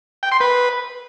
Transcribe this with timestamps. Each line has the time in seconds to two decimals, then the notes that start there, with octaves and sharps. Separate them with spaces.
0.23 G5
0.32 C6
0.40 B4